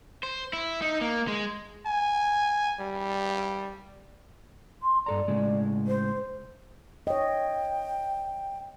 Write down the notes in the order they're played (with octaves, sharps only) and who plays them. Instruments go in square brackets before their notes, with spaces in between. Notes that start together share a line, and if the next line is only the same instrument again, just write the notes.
[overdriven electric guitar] C5
E4
D#4
A#3
G#3
[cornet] G#5
G3
[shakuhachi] C6
[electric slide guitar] G2 A4 A#5 [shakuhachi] D5
[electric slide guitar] A2 C#3 G#3
[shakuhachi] C5
[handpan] C#5 D#5 [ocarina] G5